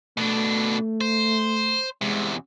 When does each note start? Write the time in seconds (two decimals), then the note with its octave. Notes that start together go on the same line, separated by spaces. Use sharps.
0.18 B2 A3 D4
1.01 C5
2.02 E2 C3 G#3